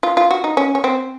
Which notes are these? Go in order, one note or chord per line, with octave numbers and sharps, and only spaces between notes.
F4
F4
F#4
D#4
C#4
C#4
C4